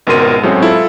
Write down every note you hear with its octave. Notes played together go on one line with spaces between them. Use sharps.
G#1 C#2 B2 A#4 C6 D#7
A2 F#3 G#3 C4 C#4
E4 F4 A4